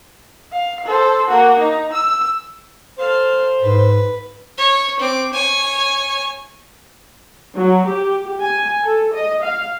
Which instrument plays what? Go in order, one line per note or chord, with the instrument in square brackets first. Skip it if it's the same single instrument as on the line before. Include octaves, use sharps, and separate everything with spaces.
[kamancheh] F5
A4 C5
A#3 F#4
D#4
E6
[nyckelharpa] A4 F5 [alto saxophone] C5
[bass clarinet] G#2 [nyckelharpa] B4
[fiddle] C#5
C4 D6
C#5 G#5
[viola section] F#3
G4
G#5
A4
D#5
F5